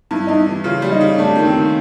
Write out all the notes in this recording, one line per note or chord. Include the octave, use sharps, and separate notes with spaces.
G2 E4
G2 D#4
E4
E3
C#3 F4
G3
D#4
C#3
A3 D4
D#3
C4
D#3